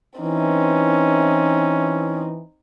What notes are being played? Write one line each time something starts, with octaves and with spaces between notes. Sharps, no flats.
E3 C4 C#4 D#4